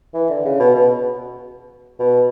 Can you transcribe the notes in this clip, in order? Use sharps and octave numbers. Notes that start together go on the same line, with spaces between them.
E3
D3
C#3
B2
B2
B2